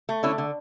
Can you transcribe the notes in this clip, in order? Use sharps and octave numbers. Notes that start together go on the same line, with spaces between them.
A3
D3 C#4 E4
D3